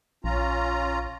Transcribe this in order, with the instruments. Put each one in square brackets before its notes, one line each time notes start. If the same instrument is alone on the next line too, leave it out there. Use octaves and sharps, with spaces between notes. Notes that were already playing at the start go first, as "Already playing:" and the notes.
[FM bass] A#1 [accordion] C#4 F4 A#5